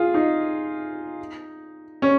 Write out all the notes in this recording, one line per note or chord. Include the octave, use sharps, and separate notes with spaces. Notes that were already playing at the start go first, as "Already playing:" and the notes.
Already playing: F4 G#4
D#4
C#4